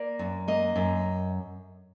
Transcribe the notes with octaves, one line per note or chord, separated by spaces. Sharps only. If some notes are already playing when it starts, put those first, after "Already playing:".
Already playing: A#3 D5
F#2
A#3 D#5
F#2